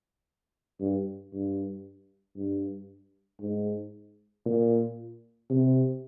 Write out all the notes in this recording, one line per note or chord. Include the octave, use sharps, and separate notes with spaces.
G2
G2
G2
G#2
A#2
C3